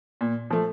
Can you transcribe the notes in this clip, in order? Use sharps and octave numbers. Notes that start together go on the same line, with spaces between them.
A#2
F3 A3